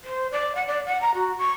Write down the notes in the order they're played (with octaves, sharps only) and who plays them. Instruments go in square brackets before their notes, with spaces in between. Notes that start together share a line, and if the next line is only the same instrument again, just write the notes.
[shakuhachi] C5
D5
F#5
D5
F#5
A#5
F#4
C#6